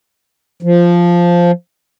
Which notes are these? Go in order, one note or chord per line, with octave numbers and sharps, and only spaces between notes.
F3